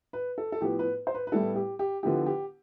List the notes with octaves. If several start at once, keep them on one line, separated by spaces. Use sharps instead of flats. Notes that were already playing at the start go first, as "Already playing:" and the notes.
B4
A4
A4
A2 F3 B3 G4
B4
C5
B4
B4
A2 G3 B3 E4 A4
G4
G4
D3 F3 B3 E4 G4
G4